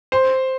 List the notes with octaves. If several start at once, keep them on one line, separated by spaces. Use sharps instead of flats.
C5